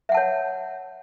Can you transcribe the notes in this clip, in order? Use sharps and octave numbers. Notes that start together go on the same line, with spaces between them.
C#5 E5 F#5 A5